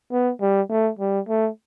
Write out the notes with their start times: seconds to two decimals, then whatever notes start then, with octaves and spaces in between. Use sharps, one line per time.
0.12 B3
0.41 G3
0.70 A3
0.99 G3
1.29 A3